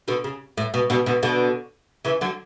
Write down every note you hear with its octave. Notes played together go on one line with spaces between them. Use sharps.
B2 D3
C#3
A2
B2
B2 D3
B2 D3
B2 D3
C#3 E3
D3 F#3